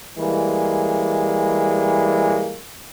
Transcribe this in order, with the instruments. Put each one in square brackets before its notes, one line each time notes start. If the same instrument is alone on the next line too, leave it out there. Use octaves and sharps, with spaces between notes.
[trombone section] E3 G3 G#3 A#3